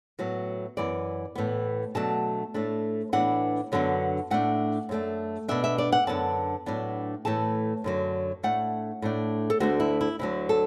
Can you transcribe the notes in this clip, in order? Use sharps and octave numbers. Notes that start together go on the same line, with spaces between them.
A2 F#3 B3
F#2 E3 B3 D5
A2 E3 B3
B2 F#3 A3 D4 A5
A2 A3 D4
A2 E3 B3 D4 F#5
F#2 D3 F#3 B3 D4
A2 A3 D4 F#5
F#2 F#3 A3 D4
B2 B3 D4 E5
E5
D5
F#5
F#2 D3 B3 D4 A5
A2 F#3 B3 D4
A2 E3 A3 A5
F#2 D3 F#3
A2 A3 D4 F#5
A2 A3 D4
A4
D2 D3 A3 D4 F#4
E4
E4
D2 D3 F#3 E4
A4